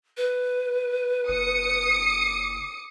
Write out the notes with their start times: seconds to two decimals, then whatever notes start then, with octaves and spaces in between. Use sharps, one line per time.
0.17 B4
1.28 F#1 D#6 C#7